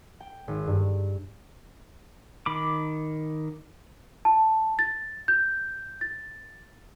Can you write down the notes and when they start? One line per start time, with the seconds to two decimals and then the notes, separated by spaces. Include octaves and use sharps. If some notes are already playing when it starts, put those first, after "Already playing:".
0.20 G5
0.48 G#1
0.67 G2
2.46 D#3 B5 D6
4.25 A5
4.79 A6
5.28 G6
6.01 A6